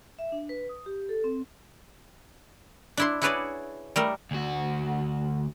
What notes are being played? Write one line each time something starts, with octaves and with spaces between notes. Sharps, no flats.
E5
D4
B4
D#6
G4
A4
C4
D4 E4 C6
E4 F#4 G#4 B4 C#5 D5
G3 A3 A#4
D2 F#4